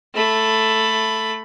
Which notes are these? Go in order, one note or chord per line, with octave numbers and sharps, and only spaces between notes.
A3 B5